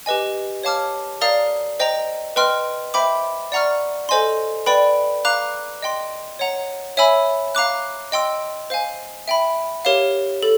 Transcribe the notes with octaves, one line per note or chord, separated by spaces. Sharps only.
G4 B4 D#5 G#5
C#5 F5 A5 D6 F6
A#4 D5 F5 A#5 D#6
C5 D#5 G5 A#5
B4 D#5 G5 C6 F6
C5 E5 G5 B5 D6
D5 F#5 A#5 C#6 F6
A4 C5 D#5 G#5 C6
B4 D5 G5 B5
F5 A#5 D6 F#6
D#5 G5 C6
C#5 F#5 A#5
C#5 E5 G#5 B5 E6
F5 A#5 D6 F#6
D#5 G5 C6 E6
C5 F5 G#5
E5 G5 B5
G4 A#4 C#5 F5
A4